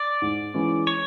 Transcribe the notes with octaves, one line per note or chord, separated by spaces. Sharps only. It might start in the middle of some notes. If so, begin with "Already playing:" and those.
Already playing: D5
G#2
E3 G#3 C#4
C#5